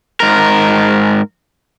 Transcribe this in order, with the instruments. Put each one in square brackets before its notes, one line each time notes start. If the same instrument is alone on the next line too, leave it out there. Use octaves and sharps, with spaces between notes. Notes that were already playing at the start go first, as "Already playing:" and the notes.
[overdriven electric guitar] G#2 A#4